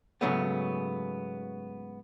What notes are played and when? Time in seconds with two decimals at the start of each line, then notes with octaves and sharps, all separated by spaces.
0.21 G#2 C#3 F#3 A3 B3